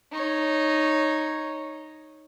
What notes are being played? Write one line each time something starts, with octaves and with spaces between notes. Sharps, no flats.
D#4 C#5